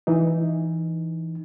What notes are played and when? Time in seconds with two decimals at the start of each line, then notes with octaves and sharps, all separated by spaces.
0.07 E3 D#4